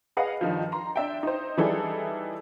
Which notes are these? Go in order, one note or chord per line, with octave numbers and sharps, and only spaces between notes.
G#4 B4 D#5 F5 F#5
G2 D#3 F3
A#5 C6
D4 E5 G5
D#4 C5
E3 G3 D#4 E4 G#4 A4